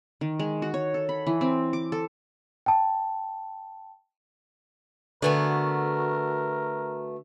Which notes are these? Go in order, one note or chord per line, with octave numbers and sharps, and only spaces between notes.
D#3
G#3
F#4
C#5
A4
B5
E3
C4
D6
A4
G5 A5
D3 A3 B3 F#4 A#4 G#5